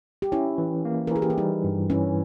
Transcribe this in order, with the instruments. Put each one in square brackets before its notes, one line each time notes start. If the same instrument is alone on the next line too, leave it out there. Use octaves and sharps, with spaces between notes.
[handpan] G4
[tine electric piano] C#4 [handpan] E4
[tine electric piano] E3
A#3
[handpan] A#4
[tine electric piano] E3 [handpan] G#4
[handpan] G4
E4
[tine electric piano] G3 [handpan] D#4
[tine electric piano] G2
[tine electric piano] E3 [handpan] C#4